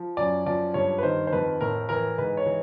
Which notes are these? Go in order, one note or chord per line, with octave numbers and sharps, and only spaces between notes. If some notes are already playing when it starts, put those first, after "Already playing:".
Already playing: F3
F#2 D5
F3 D5
G2 C#5
B4
D#3 C5
C5
F2 B4
A2 A#4
E3 A#4
G#2 B4
C#5
E3